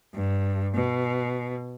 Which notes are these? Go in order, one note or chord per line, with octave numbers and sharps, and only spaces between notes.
G2
B2